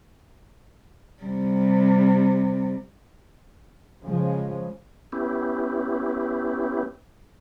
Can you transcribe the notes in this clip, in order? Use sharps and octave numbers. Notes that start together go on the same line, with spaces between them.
C3 G3
C#3 F3 G#3
B3 C#4 E4 G4